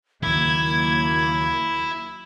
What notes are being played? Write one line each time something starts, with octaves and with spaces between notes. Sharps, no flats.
D#2 C#3 F#3 A#3 E4 G#6